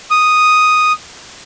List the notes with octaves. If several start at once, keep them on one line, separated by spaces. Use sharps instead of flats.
D#6